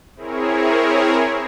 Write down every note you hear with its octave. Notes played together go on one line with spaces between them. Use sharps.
C4 E4 G#4 A#4 C#5